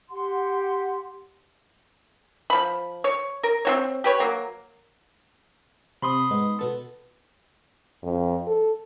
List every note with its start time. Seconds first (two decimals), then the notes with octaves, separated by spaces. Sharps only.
0.10 G4 F#5 C6
2.50 F3 B5
3.04 C#5
3.43 A#4
3.65 C4 F#4 C#5
4.04 G4 B4 C#5
4.20 F#3 A#3
6.02 C3 B5 C6 D#6
6.31 G#2 B3 D#4
6.59 B2 B3 A4
8.02 F2
8.47 A4